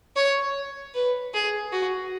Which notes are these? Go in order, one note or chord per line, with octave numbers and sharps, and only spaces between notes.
C#5
B4
G#4
F#4